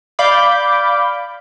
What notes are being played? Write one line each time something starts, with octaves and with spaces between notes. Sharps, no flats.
D5 F5 B5 D6 G6